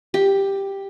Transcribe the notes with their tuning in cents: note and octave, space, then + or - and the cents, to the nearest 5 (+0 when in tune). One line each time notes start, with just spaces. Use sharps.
G4 +5